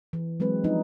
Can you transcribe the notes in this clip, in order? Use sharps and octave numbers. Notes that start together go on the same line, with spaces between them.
E3
F#3 G#3 C4 B4
F3 B3 D4 D#4